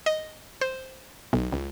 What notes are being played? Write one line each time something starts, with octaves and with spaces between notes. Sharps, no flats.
D#5
C5
B1
C#2